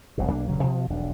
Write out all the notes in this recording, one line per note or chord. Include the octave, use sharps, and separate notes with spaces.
F1 C2 B2
B1 A#3 D4
D#1 G2 C#3 F#3
B2 F3
E1 B1 F2 D4